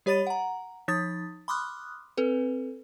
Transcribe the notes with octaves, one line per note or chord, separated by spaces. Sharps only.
G3 G4 C#5 B5 A6 D#7
F#5 A#5
F3 D#4 D#6 A6
B5 C6 D6 D#6 F6 F#6
C4 A4 B4